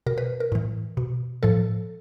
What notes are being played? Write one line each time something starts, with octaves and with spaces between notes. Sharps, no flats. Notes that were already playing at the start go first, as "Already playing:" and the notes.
B2 A#4
B4
A#4
A2 E3
B2
A2 F3 A4